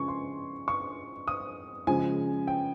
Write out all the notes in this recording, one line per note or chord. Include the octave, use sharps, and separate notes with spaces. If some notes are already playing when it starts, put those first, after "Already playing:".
Already playing: C#3 F3 G#3 G#5 C#6
C6
C#6
D#6
C#3 F3 G#3 G#5
G5